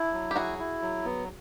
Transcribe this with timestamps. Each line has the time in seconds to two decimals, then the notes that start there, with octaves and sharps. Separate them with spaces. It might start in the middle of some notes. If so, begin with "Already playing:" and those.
Already playing: D4 E4
0.13 F#3
0.31 G4
0.36 E4 F#4 G#4
0.59 E4
0.82 F#3
1.05 B3